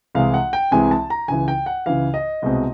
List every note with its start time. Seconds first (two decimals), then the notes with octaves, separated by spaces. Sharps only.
0.15 C2 C3 E3 G#3 F5
0.34 F#5
0.53 G5
0.71 C2 C3 E3 G#3 G#5
0.91 A5
1.10 A#5
1.28 C#2 C#3 E3 G#5
1.48 G5
1.66 F#5
1.86 C#2 C#3 E3 F5
2.14 D#5
2.42 C2 B2 G#3 C4